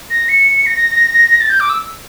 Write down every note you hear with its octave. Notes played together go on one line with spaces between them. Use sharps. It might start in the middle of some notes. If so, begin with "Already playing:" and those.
A#6
C#7
A#6
A6
G6
D6
E6